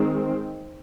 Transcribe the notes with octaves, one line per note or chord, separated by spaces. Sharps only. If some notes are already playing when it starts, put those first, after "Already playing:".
Already playing: D#3 G#3 C4